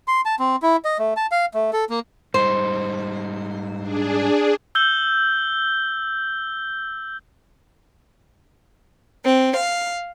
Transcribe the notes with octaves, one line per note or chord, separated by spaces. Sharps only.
C6
A5
C4
E4
D#5
A3
A5
F5
A3
A4
A#3
G#2 G3 D#4 C5
D4 G#4
E6 G6 G7
C4
F5